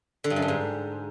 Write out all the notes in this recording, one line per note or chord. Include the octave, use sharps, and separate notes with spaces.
D3
G2
F#2
G2
G#2